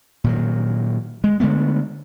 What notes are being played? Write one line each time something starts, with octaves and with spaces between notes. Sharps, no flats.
A#2 D#3 F#3
G#3
D3 G#3 A3 B3